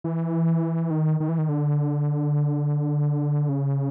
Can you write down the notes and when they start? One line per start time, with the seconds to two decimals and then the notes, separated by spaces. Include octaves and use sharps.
0.04 E3
0.90 D#3
1.20 D#3
1.29 E3
1.38 D#3
1.49 D3
3.49 C#3